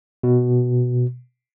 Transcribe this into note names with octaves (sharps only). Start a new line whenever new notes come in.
B2